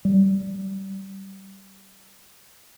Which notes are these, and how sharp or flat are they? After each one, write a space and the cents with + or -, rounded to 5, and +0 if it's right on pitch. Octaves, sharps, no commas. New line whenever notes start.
G3 -20